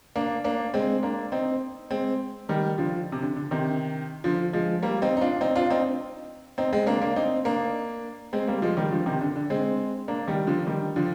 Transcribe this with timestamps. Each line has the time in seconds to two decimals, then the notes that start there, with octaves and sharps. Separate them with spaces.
0.16 A#3 D4
0.44 A#3 D4
0.74 G#3 C4
1.03 A#3 D4
1.32 C4 D#4
1.91 G#3 C4
2.49 D#3 G3
2.78 D3 F3
3.12 C3
3.22 D3
3.36 D3
3.51 C3 D#3
4.24 D3 F3
4.53 F3 G#3
4.82 G3 A#3
5.02 C4 D#4
5.17 D#4
5.21 D4 F4
5.41 C4 D#4
5.55 D4 F4
5.70 C4 D#4
6.58 C4 D#4
6.73 G#3 C4
6.86 A#3 D4
7.02 A#3 D4
7.16 C4 D#4
7.45 A#3 D4
8.33 G#3 C4
8.48 G3 A#3
8.62 F3 G#3
8.77 D#3 G3
8.91 D3 F3
9.06 C3 D#3
9.21 D3
9.36 D3
9.50 G#3 C4
10.08 A#3 D4
10.28 D#3 G3
10.47 D3 F3
10.67 D#3 G3
10.96 D3 F3